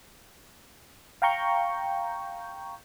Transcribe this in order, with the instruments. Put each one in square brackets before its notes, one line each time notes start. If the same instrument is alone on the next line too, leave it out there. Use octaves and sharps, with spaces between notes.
[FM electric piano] F5 G5 A#5 C#6 G6